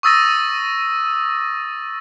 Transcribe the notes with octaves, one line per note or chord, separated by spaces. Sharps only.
C#6 D#6 E6 A6 A#6 D#7